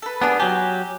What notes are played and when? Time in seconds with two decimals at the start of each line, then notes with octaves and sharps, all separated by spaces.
0.02 A4 B4
0.22 B3 D4 G4 G#4 D#6
0.40 F#3 G4 G#5